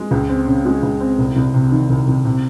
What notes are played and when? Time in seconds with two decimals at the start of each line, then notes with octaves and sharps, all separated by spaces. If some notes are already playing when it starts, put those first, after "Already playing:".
Already playing: G#3
0.11 C#2
0.29 C4
0.47 C#3
0.65 G#3
0.83 C#2
1.00 C4
1.18 C2
1.36 C2
1.54 C3
1.71 D#3
1.90 C2
2.07 C2
2.25 C3